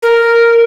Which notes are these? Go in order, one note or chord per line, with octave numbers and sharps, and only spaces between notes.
A#4